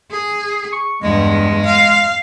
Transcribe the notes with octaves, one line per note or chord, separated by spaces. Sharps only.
G#4
C#6
E2 G2 G#3
F5